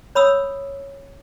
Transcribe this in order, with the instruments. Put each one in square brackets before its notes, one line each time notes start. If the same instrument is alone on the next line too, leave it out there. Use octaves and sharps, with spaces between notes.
[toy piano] C#5 B5 D#6 E6